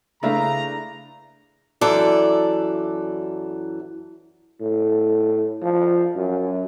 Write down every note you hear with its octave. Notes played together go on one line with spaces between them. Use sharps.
C#3 A3 D4 E4 B4 F5 A#5
F#2 E3 A4 D5
A2
F3
F#2